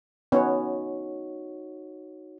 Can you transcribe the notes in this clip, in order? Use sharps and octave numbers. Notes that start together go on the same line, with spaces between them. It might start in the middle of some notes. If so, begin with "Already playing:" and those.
B3 C#4 D#4 F#4 C#5